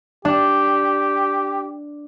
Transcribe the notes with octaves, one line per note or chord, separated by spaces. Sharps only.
D4 G4